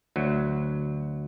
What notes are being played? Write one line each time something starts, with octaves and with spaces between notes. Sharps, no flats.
D2 F#3